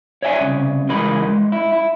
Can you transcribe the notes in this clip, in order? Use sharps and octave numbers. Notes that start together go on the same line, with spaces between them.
C#5 D5 E5 F#5 G#5
C2 C#3
C#2 E3 G#3 A#4 B5
G#3
E4
E4